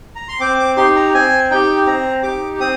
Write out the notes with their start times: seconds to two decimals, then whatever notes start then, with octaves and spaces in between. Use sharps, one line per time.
0.15 A#5
0.28 C6
0.40 C4 D6
0.59 D6
0.76 D#4 G4 C6
0.96 A#5
1.14 C4 G#5
1.51 D#4 G4 G5
1.86 C4 A#5
2.23 D#4 G4 D6
2.60 C4 D#6